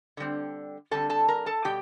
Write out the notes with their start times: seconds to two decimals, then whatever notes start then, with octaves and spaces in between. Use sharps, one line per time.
0.17 D3 G3 C4
0.91 D3 G3 C4 A4 A5
1.10 A4 A5
1.28 A#4 A#5
1.46 A4 A5
1.64 B2 G3 G4 G5